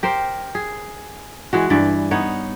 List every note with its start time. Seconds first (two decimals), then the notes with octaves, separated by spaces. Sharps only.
0.03 G4 A#4 C5
0.55 G#4
1.53 E3 G#3 F#4
1.70 G2 E3 D5
2.11 B3 D#4 C#5